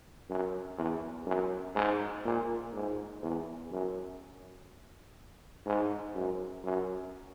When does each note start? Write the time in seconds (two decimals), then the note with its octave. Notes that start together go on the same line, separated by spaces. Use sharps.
0.30 F#2
0.78 E2
1.27 F#2
1.75 G#2
2.25 A#2
2.73 G#2
3.22 E2
3.72 F#2
5.66 G#2
6.15 F#2
6.64 F#2